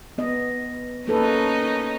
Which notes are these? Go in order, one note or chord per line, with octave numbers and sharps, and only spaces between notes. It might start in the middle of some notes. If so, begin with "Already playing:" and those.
B3 D#5
A#3 C#4 D#4 A4 B4